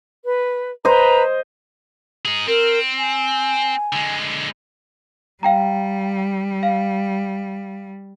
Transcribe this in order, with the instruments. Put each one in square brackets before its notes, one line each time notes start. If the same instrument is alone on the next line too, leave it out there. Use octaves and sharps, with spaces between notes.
[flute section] B4
[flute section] B4 A#5 [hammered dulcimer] C5 D#5
[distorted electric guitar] D#4 G#4
[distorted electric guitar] C4 [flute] A#4
[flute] G#5
[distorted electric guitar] D3 G#3
[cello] G3 [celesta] F5 G5 A#5
[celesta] F5